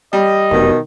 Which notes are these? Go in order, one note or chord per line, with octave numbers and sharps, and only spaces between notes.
G3 D#5
F1 B2 D#3